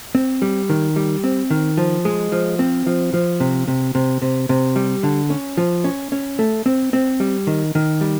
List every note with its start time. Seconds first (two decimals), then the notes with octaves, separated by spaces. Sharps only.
0.15 C4
0.42 G3
0.70 D#3
0.96 G3
1.24 C4
1.50 D#3
1.77 F3
2.05 G#3
2.32 F3
2.59 C4
2.86 F3
3.14 F3
3.40 C3
3.68 C3
3.95 C3
4.22 C3
4.49 C3
4.76 G3
5.03 D3
5.30 C#4
5.57 F3
5.84 C#4
6.12 C#4
6.39 A3
6.66 C4
6.93 C4
7.20 G3
7.47 D#3
7.75 D#3
8.01 G3